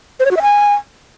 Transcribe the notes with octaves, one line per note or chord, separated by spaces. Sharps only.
C5
C#5
F#4
E5
G#5